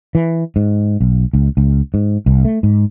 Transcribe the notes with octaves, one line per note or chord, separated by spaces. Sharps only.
E3
G#2
B1
C#2
C#2
G#2
C2
A3
G#2